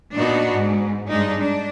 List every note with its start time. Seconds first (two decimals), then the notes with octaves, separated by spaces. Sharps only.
0.14 A#2 B3 D4 D#4 F#4
0.53 G#2
1.08 G2 G#3 D4 D#4
1.38 D4